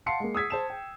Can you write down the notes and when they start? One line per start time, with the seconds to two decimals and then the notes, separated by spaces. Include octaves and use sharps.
0.06 F5 F#5 A5 C6 C7 C#7
0.20 G#3 A#3
0.35 D#6 E6 G#6 B6
0.50 C5 A5 E7
0.70 G5